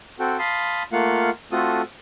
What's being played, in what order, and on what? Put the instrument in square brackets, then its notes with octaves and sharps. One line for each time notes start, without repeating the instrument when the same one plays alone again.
[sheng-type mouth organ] C4 F#4 A4 G5
F5 A5 B5 C6 D#6
A3 A#3 F4 F5 F#5
A3 C4 F4 F#4 A4 D#6